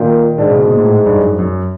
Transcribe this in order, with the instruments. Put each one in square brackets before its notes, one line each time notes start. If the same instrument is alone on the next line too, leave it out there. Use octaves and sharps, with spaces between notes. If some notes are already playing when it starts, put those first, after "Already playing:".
Already playing: [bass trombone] A#2 [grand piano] D#3
[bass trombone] G#2 [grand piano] D3
[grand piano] C#3
B2
A#2
A2
G2
F#2
F#2